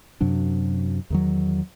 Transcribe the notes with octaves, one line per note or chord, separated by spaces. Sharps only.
F#2 C3 F#3 D4
E2 D#3 F#3